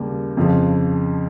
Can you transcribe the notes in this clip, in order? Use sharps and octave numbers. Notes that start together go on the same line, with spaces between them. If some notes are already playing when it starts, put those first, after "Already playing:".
Already playing: D#2 C#3 G3 A#3
F2 C#3 F3